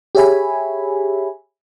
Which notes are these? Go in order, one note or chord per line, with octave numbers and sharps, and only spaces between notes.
G4 G#4 C#5 E5 G#5 B5